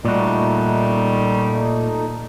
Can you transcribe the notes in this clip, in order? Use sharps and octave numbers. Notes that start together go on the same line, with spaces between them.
A#2 G3 A3 D#4 F#4